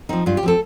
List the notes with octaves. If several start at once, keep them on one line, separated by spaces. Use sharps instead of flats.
F3 C4 D#4
G2 F4
G4
F3 C4 A4